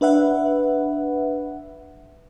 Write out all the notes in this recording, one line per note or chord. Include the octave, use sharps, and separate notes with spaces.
D4 B4 E5 F#5